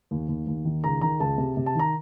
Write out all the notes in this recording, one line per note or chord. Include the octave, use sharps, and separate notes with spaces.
D#2
D#2
D#2
D#3
C#2 A#5
D#3 A#5
C#2 A5
C3
C3
A5
D#3 A#5